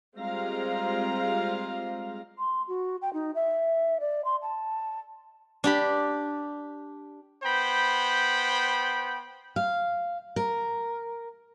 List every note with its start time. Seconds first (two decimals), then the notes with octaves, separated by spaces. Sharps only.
0.18 G3 G#3 C4 F4 F5 A#5
2.39 C6
2.68 F#4
3.02 G5
3.13 D#4
3.35 E5
4.00 D5
4.25 C6
4.42 A5
5.64 D4 G4 B5
7.44 B3 C5 G5 B5
9.56 F5
10.36 A#4